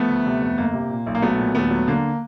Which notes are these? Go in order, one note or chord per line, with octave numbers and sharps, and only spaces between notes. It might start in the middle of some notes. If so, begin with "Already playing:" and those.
Already playing: F3 A3 B3
D2
C3
F2
G1 A#3
C3
A#2
B1
A#3
F#3 A3 B3
A#2
D#2 A3 B3
F#3
D3 A#3